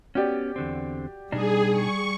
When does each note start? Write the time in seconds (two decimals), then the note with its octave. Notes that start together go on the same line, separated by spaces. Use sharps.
0.15 B3 C#4 F#4 G4 D5
0.56 E2 D3 C4
1.32 B2 G3 D4 D#4 G#4
1.71 C#6